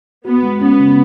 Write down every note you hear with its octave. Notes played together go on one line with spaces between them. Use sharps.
B3 F#4
G#3
B3 C#4
C#3